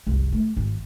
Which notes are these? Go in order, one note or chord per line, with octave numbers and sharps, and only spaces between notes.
F#1 C2
A3
G#1